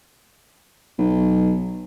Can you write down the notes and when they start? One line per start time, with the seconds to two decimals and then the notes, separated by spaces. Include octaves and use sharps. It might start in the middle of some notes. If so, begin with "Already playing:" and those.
0.98 B1